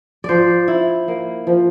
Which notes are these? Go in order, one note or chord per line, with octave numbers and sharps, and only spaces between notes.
F3 C5 D5
E4
A#3
F3